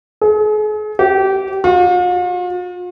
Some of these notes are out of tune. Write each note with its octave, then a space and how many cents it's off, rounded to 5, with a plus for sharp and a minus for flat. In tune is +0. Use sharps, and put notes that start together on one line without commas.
G#4 +40
G4 -25
F4 +45